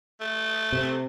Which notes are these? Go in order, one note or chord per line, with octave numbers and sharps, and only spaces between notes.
A3
C3